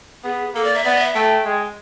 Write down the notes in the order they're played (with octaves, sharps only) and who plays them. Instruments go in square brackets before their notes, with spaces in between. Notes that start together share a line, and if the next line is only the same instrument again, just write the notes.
[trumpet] B3 [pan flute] G#4
[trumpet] A#3 [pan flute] A4
[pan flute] D5
E5
[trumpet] B3 [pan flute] D5
[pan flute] D#5
E5
[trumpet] A3 [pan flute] G5
[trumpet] G#3